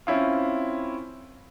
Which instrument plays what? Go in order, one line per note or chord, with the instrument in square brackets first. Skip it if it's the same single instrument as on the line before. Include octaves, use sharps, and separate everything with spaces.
[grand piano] C4 C#4 E4 F4